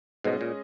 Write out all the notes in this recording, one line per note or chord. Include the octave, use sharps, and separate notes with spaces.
G#2 B2 G#3 C#4 G#4 D#5
A#2